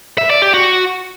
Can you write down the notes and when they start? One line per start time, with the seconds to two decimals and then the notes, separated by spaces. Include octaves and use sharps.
0.18 E5
0.30 D5
0.42 G4
0.54 F#4